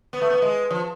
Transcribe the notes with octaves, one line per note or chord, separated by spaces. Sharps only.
B3
A3
B3
G#3
F3